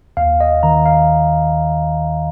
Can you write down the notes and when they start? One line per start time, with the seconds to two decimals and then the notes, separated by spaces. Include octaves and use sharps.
0.17 D#2 F5
0.41 D#5
0.63 D#3 A#5
0.86 F5